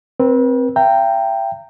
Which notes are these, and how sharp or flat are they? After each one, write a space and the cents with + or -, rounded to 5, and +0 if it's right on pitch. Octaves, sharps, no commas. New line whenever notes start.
C4 +0 B4 -40
E5 +40 G5 +0 A#5 -20